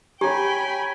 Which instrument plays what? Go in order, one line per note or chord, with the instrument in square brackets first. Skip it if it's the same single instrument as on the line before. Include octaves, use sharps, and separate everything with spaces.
[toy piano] G4 [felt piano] C#5 A#5 [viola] G5 B5 [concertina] G#5